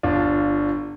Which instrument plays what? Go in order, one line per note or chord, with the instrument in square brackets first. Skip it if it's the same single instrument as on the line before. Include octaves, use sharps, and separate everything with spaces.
[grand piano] G1 D4 F4